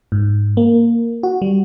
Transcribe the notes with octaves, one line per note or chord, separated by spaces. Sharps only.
G#2
A#3
F#4
G3